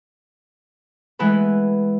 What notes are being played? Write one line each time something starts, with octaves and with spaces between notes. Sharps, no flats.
E3 G#3 A3 B3 A4 B4